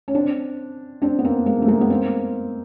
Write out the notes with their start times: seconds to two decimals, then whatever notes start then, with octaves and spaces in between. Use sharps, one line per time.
0.08 C#4
0.15 C4 D4
1.02 C4 D4
1.19 B3
1.24 A#3 C4
1.46 G#3 A#3
1.62 A3
1.68 G#3 A#3
1.81 B3
1.90 A#3 C4